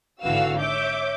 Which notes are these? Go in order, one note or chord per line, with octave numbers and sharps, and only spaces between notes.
G#1 D3 E3 F#4 F5 E6
C#5 E5 D6 G6